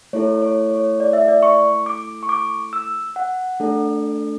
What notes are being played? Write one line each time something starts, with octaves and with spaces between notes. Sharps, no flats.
A3 E4 A4 C#5
C#5
C#5
D5
E5
D5
C#6
D6
C#6
D6
E6
F#5
A3 D4 A4